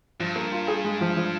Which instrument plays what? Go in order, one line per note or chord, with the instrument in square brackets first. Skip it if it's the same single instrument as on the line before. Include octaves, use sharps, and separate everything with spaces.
[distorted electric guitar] G2 [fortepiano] F3
[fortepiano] A#3
F4
G#4
G#3
F3
F3